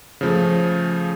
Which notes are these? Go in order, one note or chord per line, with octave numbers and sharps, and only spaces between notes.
C#3 F3 A3